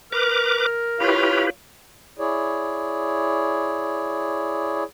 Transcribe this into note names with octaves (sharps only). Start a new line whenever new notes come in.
A#4 B4 D6 F6
E4 F4 G4 B4 C#5 F5
E4 G#4 C#5 D5